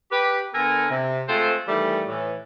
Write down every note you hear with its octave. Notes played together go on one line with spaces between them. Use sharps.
G4 B4
D3 B3 A4 A#4 G#5 A#5
C3
G#3 A3 C4 F4 A4 C5
D#3 E3 G3 A3
A2 E3